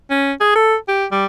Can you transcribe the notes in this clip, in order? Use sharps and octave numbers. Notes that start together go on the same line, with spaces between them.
C#4
G#4
A4
G4
G3